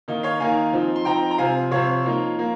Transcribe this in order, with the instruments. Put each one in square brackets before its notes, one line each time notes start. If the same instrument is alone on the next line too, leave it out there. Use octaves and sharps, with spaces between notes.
[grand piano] D#3 A#3 D#4
C#5 F5
D#3 A#3 D#4 F5 G#5
F3 C4 D#4
C6
F3 C4 D#4 G5 A#5
A#5
C3 F3 C4 F5 G#5
C3 F3 C4 C#5 F5
F3 A#3 D#4
F3 A#3